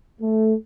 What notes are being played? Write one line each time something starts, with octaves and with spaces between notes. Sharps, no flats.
A3